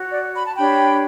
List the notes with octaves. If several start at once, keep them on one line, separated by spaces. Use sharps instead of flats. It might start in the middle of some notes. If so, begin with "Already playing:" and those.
Already playing: F#4 C#5
D5
B5
A5
D4 G4 C#5 G5 B5